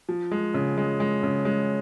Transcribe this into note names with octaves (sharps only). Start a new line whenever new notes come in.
F3
G#3
C#3
G#3
G#3
C#3
G#3